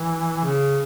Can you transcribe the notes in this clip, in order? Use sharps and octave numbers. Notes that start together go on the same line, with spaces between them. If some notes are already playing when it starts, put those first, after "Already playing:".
Already playing: E3
C#3